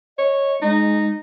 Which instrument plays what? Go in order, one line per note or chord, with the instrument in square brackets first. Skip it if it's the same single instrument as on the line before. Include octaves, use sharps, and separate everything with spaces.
[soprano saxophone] C#5 [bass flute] D#5
[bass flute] G#3 [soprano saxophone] D#4